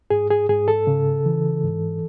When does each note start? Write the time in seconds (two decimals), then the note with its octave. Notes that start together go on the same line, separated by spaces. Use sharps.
0.10 G#2 G#4
0.30 G#4
0.49 G#2 G#4
0.68 A4
0.87 C#3
1.25 E3
1.63 G#2